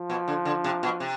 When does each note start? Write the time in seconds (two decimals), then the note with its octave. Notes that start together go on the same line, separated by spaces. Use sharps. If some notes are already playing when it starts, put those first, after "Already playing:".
Already playing: F3
0.10 B2
0.28 D3
0.45 D3
0.64 C3
0.83 B2
1.00 C3